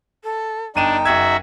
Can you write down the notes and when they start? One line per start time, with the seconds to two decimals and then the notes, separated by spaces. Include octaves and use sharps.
0.24 A4
0.76 G1 D4 D#4 G5 D#7 E7
1.05 F#1 F#4 E5 G#6